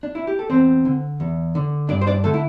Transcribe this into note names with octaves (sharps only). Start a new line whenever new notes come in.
D4
E4
G4
A4
E2 C4 C5
D3
E2
D3
G2 D4 D5
C5
D4 D5
D3 A3 A4
E4